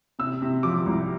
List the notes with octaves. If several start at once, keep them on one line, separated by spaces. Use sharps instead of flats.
C3 E6
C3
F3 D6
C2